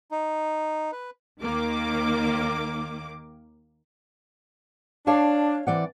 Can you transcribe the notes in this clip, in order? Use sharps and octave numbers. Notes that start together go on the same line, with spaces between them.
D#4
B4
D#2 D#3 A#3 D6
D4 C#5 F5 A5
E3 C4 D5 F#5